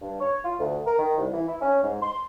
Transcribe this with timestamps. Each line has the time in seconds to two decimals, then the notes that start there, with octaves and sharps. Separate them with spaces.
0.01 G2
0.21 C#5
0.45 F4
0.59 D2
0.87 A#4
0.99 D#3
1.18 C2
1.33 E3
1.48 E4
1.62 C#4
1.83 G#2
2.02 C6